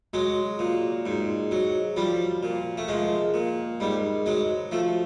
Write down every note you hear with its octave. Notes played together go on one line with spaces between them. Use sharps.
F#3 G#3
A#2
G#2
F#3
F3 G3
A#2
A3
F3 G#3
A#2
G#2 G3
F#3 G#3
F3 A3